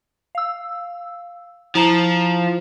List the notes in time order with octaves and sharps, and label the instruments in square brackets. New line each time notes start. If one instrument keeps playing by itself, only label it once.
[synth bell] F5 E6
[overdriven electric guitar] F3 [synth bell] E4 A#5